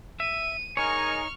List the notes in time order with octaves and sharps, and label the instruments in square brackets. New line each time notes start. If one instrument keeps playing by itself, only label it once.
[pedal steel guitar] E5 [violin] D#7
[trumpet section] G#3 A#4 G#5 [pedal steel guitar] D#4 C#5 [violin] C#6 F6